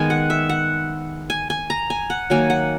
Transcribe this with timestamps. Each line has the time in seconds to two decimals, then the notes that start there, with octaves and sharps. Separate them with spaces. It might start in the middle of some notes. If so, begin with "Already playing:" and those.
Already playing: D#3 G#3 B3 G#5
0.10 F#5
0.30 E5
0.49 F#5
1.30 G#5
1.50 G#5
1.70 A#5
1.90 G#5
2.10 F#5
2.30 D#3 F#3 A#3 G#5
2.50 F#5